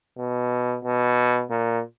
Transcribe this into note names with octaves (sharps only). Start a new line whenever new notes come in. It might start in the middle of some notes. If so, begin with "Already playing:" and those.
B2
B2
A#2